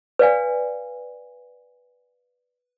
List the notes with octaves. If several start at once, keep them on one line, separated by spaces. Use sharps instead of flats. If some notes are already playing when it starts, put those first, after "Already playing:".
B4 D5 F5 G#5